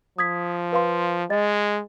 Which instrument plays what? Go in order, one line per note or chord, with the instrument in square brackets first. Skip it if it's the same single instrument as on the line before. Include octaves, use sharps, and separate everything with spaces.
[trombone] F3 [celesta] D#6 G#6 B6
[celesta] B4 F5 C6
[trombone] G#3 [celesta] D#5 A6